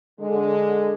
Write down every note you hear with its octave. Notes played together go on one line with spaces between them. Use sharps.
D3 G#3